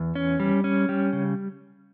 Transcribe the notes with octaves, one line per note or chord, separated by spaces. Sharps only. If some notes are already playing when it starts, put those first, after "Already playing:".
Already playing: E2
C#4
G3
C#4
G3
C#3